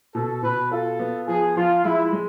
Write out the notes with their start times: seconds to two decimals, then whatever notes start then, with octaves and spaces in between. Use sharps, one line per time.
0.14 B2 A4
0.43 B2 B4
0.71 F4 A4
0.99 B3
1.27 F3 G#4
1.56 F3 F4
1.85 G#3 E4
2.13 G#3